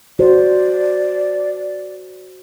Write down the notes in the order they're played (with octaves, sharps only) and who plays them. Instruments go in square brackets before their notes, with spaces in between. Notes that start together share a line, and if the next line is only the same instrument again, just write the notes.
[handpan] F#4 C5 [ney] D5